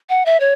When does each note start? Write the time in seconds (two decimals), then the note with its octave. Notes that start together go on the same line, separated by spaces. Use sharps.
0.09 F#5
0.26 E5
0.40 C#5